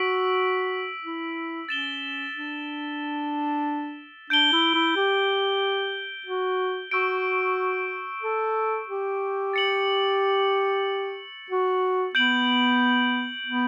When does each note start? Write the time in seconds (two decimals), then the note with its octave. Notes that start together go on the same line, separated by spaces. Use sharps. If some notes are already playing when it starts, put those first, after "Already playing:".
Already playing: F#4 E6 B6 D7 F#7
1.04 E4
1.69 C#4 A6 E7 G7
2.34 D4
4.30 D4 G6 D7 G7
4.52 E4
4.74 E4
4.96 G4
6.26 F#4
6.91 F#4 C#6 E6 G6 D7
8.22 A4
8.88 G4
9.53 A6 C#7 F#7
11.50 F#4
12.15 B3 G6 D7 F#7
13.46 B3